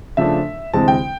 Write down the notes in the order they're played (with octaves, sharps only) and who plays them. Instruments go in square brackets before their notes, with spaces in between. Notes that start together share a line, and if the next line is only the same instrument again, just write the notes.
[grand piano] C#3 F3 A3 D4 E5
D2 C3 E3 G#3 C4 A5
G5